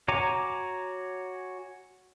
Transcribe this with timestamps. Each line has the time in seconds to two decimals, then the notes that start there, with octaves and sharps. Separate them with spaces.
0.08 F#4 C#5 G#5 A#5 D6